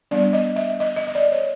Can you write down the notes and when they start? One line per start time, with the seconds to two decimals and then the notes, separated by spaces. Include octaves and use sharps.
0.11 G3 B3 D4 D5
0.33 D#5
0.56 E5
0.80 D#5
0.96 D#5
1.07 D#5
1.15 D5
1.32 C#5